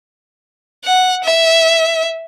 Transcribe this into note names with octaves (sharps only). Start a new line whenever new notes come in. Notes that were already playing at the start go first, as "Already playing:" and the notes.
F#5
E5